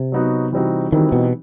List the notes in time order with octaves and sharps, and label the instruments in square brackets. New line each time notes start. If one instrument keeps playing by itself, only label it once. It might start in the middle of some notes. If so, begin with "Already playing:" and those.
Already playing: [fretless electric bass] C3
[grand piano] F#3 B3 D#4 F#4
E3 G3 C4 D#4 F#4
[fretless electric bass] D#3 [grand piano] E3 G3 C4 D#4 F#4
[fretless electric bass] B2